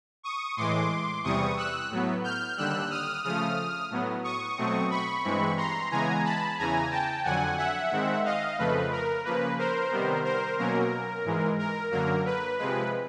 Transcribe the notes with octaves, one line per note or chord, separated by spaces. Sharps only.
C#6 D#6
A2 E3 G#3 C6 D6
E2 C3 E3 G3 C#6 D#6
E6 F#6
A2 F#3 B3
F6 G6
D#2 D3 G3 E6 F#6
D#6 F6
C#3 F3 A3 D#6 F6
A2 F#3 B3
C#6 D#6
B2 F#3 A3 C4
B5 C#6
G2 E3 G#3 C4
A#5 C6
C#3 E3 G#3 B3 G#5 A#5
A5 B5
E2 C#3 E3 G#5 A#5
G5 A5
F2 D3 F#3 F#5 G#5
E5 F#5
G#2 D#3 G#3 C4
D#5 F5
F2 C#3 F3 A3 B4
A#4
C#3 F3 A#3 B4
A#4 C5
C3 D#3 G3 B3
A#4 C5
B2 F#3 A#3 C#4 A#4
G#2 E3 G#3
A#4
F#2 D3 F#3 A#3 A#4
B4
C3 F3 G#3 B4